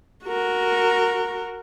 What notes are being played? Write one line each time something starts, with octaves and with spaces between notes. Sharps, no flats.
F#4 A#4